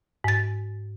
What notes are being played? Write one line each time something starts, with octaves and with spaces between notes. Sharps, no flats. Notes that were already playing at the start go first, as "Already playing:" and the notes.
G#2 A6